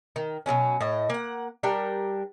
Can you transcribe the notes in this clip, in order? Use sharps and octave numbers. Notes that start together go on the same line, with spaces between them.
D#3
B2 D3 F#3 C#4
A2 D#5
A#3 F#5
G3 D4 A#4 G5